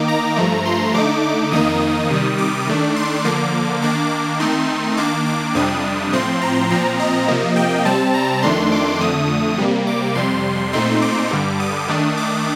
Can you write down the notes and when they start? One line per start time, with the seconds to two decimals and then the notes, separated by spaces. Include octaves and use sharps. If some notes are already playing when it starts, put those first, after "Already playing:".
Already playing: D#3 A#3 D#4 D6
0.08 A#5
0.36 G2 F3 A3
0.65 C6
0.94 D3 A3 D#4 D6
1.23 D6
1.52 F2 D#3 A#3 D#4 D#6
2.10 C3 D#3 G3
2.38 D6
2.67 D#3 A3 D4
2.96 C6
3.25 D3 F3 A#3 D6
3.82 D#3 A#3 D4 D6
4.11 D6
4.40 D#3 A3 C4 D#4 C6
4.97 D#3 A#3 D4 D6
5.26 D6
5.55 F2 C3 G3 D4 D#6
6.12 A2 F3 C4 C6
6.42 A#5
6.70 A#2 F3 C4 A#5
7.00 D#5
7.28 C3 F3 A#3
7.56 G5
7.85 C3 G3 C4 A5
8.14 A#5
8.43 F2 D#3 A3 D4 C6
8.72 D6
9.01 F2 D3 A3 D#6
9.58 C3 G3 A#3
9.87 D6
10.15 F2 C3 G3 C6
10.73 A#2 A3 C4 D#4 C6
11.02 D6
11.30 G2 D3 G3
11.60 D#6
11.88 D#3 A3 D4
12.17 D6